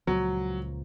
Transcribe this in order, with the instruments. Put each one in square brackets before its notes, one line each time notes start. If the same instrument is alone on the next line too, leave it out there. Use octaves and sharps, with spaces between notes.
[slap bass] C#2 A#2 F3 [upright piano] F#3